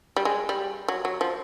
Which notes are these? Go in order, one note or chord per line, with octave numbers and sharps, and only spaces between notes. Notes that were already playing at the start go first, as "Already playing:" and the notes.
G3
G#3
G3
F#3
F#3
F3